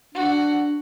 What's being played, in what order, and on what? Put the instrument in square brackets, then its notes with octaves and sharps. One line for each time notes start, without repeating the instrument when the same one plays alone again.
[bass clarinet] D4 [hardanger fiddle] F#4